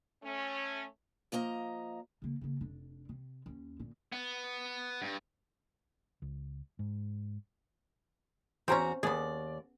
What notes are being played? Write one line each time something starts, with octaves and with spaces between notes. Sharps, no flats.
A3 C#4
F3 A#3 D#5 A#5
C#3 A#3
C#3 A#3
F1 D4
C3
D#2 C#4
G1 A#2
B3
G2
C#2
G#2
E2 C4 C#4 F#4 A#5
D#2 B3 G#4 D5